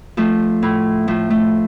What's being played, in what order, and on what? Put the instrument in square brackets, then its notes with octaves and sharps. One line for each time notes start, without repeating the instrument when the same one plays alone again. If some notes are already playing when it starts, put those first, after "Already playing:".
[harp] F3 A3
A2
F3 A3
A3